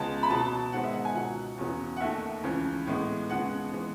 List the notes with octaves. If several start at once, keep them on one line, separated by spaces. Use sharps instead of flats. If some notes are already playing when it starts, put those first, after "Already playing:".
Already playing: C#2 C#3 G#3 B3 A5
B5
B2 F#3 B3 A5
G#2 D#3 G#3 B3 F#5
E5
F#5
G#5
C#2 B2 F#3 F#5
E2 C#3 F#3 B3
F#5
D#2 D#3 A3 E5
C#2 C#3 E3
A2 G#3 B3
D#2 C#3 G#3 B3 F#5
E3 G#3 B3